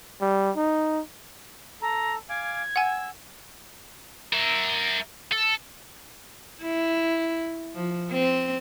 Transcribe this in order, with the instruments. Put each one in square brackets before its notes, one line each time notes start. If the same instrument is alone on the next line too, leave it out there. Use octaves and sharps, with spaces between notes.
[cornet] G3
D#4
[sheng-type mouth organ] A4 [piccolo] A#5
[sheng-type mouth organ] F5 G#5 D6 [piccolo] G#6
[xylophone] F#5 G#5 [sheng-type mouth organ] E6
[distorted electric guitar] A#4 E5
A4
[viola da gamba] E4
F3
C4